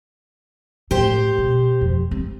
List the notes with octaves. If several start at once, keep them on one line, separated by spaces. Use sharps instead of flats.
A2 G4 C5
B2
F2
C4